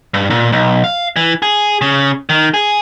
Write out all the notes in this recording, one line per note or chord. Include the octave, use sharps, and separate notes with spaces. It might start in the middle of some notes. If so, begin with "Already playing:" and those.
G2
A#2
B1
F5
E3
G#4
C#3
D#3
G#4